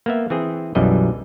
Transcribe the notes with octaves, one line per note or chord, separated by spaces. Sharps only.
A#3 B3 E5
E3 C4 G#4
B1 F#2 E3 G3 D#5